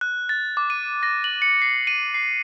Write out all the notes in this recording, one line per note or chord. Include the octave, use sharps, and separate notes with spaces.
F#6
A6
D6
D#7
A#6
F#7
C#7
C7
D#7
C7